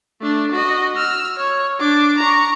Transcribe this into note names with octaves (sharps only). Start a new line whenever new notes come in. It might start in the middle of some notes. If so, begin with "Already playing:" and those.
A3 D4
F#4 D#5
E6 F6
C#5
D4 D6
A#5 C#6